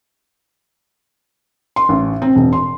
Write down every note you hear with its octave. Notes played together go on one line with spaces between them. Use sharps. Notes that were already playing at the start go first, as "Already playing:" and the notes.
C6
A1
C4
E1
C6